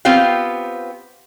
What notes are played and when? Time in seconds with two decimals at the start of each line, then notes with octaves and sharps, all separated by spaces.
0.05 B3 C4 F4 G4 F5